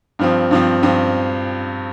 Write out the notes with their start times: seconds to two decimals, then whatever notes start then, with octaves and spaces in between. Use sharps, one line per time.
0.19 G2 F3 C4
0.51 G2 F3 C4
0.83 G2 F3 C4